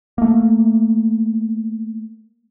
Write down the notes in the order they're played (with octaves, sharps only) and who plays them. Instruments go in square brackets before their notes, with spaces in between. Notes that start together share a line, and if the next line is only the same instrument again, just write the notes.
[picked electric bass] A3 A#3